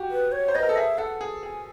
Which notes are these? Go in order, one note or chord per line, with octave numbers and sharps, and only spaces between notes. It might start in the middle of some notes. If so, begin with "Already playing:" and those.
Already playing: F#4 G4
B4
C#5
C5
B4 D#5
A#4
A4
G#4 E5
A4 F#5
G#4
G#4 G#5